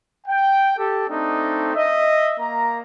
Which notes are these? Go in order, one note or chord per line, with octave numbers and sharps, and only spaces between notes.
G5
G4 A4
A3 C4 D4 D#4
D#5 E5
A#3 A#5